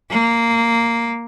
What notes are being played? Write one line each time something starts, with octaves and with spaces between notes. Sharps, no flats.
A#3